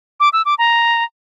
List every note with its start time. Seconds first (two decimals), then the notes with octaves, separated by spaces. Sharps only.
0.20 D6
0.33 E6
0.45 D6
0.59 A#5